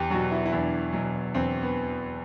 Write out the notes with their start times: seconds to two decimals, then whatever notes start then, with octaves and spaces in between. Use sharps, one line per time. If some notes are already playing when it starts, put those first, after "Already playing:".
Already playing: E2 G4
0.10 F#3 F#4
0.14 B2
0.32 E4
0.46 E4
0.52 E2 D4
0.93 B2 F#3
1.34 E2 C4
1.63 B3